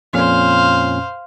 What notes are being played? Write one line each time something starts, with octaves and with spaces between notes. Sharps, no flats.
F2 A#2 C#4 C5 F5